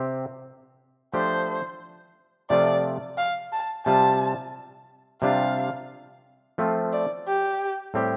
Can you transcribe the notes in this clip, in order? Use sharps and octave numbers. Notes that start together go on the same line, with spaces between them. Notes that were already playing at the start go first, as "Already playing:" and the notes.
Already playing: C3 C4 G4
F3 A3 D4 G4 C5
C3 F3 A3 F4 D5
F5
A5
C3 G3 F4 A5
C3 G3 D4 F4 F5
F3 A3 C4 F4
D5
G4
A2 G3 C4 G4